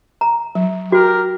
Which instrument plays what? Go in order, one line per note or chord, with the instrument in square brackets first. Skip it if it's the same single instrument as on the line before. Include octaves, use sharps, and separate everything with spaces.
[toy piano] A#5
[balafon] F#3
[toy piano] F#4 [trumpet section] G4 A#4